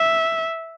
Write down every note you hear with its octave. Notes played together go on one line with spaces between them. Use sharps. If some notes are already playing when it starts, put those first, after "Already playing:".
Already playing: E5